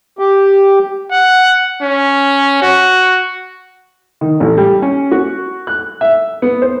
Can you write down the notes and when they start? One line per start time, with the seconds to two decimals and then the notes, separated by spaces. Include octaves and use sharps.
0.19 G4
1.11 F#5
1.82 C#4
2.62 F#4
4.21 D#3
4.40 A1
4.57 G3
4.82 C#4
5.11 F#4
5.67 F#6
6.01 E5
6.42 B3
6.62 C5